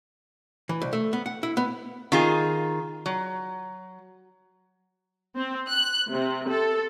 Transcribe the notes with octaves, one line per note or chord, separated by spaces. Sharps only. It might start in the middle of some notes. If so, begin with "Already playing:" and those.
E3
C2
A3
B3
F#5
E4
B3
D#3 F4 G#4
F#3
C4
F#6
C3
A4